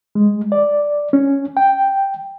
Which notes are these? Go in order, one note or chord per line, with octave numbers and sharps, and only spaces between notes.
G#3
D5
C#4
G5